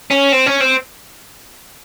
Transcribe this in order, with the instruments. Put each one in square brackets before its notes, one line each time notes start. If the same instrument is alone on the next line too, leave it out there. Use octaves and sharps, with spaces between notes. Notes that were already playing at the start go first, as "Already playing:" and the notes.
[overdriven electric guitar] C#4
C4
C#4
C4